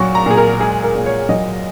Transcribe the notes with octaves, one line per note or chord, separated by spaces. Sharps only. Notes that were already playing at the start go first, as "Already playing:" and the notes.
Already playing: A#2 F#3 C#6
A#5
A#2 G#4
A#4
G#3 G#4
A#4
A#2
C#5
F#3 D#5